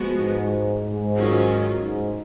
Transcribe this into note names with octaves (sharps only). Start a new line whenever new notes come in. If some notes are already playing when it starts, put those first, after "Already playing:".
Already playing: F3 G#3 B3 F#4
G#2
G#2
D#3 F#3 C#4 F4
G#2